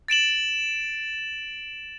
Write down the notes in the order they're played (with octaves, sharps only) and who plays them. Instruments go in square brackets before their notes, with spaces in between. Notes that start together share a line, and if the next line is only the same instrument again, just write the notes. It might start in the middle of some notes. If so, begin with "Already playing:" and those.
[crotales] A6 D7 E7 F#7